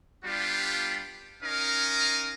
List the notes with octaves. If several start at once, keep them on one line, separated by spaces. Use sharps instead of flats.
G3 B3 D4 F4 G4
C#4 D#4 A#4 D#5 F5